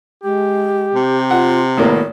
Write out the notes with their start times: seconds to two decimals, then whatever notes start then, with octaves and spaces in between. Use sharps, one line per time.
0.24 G#3 G4
0.95 C3
1.31 F4 F#5
1.77 G#1 A2 D#3 A#3 B3